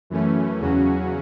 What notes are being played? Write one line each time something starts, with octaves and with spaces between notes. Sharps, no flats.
F#2 E3 A3 C#4
E2 C#3 F#3 C#4 F#4